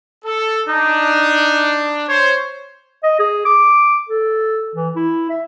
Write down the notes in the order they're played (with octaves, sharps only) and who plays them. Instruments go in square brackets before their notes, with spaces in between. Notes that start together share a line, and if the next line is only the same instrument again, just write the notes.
[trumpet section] A4
[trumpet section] D4 [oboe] D#4
[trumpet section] C5 [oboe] C#5
[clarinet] D#5
G#4
D6
A4
E3
E4
E5